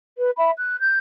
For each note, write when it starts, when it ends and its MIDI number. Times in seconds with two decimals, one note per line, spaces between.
0.17 0.29 71
0.37 0.51 76
0.37 0.51 83
0.58 0.79 90
0.80 0.97 91